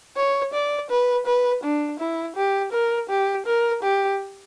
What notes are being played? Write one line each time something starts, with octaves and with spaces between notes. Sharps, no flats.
C#5
D5
B4
B4
D4
E4
G4
A#4
G4
A#4
G4